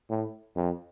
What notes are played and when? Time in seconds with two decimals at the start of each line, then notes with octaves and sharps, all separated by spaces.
0.10 A2
0.56 F2